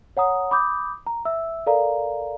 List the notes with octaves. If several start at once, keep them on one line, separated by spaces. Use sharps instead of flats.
C#5 F#5 A#5 D#6
B5 D6 D#6 G6
A#5
E5 E6
A4 A#4 D5 F5 A#5